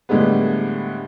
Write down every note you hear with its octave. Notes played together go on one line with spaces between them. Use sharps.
A2 D3 G3 G#3 B3